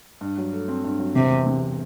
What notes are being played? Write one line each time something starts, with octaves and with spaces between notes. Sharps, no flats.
G2
F#3
A3
C4
G2
F#3
E1 C3
E2
C3